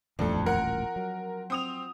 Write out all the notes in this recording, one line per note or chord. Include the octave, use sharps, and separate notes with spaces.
D#1 A1 F2 A3 D4 A4
A#4 F#5
F#3
C4 D#6 F7